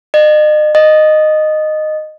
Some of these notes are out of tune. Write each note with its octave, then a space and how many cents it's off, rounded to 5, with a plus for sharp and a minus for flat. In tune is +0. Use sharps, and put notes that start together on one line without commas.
D#5 -40
D#5 -10